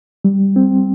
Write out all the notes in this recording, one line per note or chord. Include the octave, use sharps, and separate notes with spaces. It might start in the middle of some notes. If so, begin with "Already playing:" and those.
G3
C4